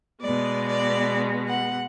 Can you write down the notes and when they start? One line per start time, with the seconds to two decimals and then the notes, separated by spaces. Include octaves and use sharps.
0.22 B2 G#3 B3 D5
0.69 D5
1.48 F#5